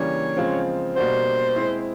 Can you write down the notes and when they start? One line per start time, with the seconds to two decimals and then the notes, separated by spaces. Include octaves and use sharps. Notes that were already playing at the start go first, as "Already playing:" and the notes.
Already playing: C#3 E3 G3 A#3 D4 C#5
0.37 C#3 F3 G#3 C4 F4
0.96 B2 G3 A#3 D4 F#4 C5
1.56 G#3 C4 E4